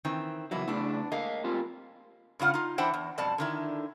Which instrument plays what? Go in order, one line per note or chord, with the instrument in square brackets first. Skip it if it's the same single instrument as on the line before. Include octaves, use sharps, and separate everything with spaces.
[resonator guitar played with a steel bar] D#3 E3 C4
[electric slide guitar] C#3 E3 F#3 [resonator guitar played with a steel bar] A#3 B3 E4
[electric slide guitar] C#3 A3 E4 [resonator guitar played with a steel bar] B3 D4
[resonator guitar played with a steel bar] G#3 A#3 [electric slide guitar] D#5 F5
[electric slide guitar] C4 F4 G4
[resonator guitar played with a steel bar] G2 C#3 F4 F#5
D#4 F4
E3 D4 E4 C5 F#5 G5
E2
F2 B2 G3 D5 A5
D3 D#3 E4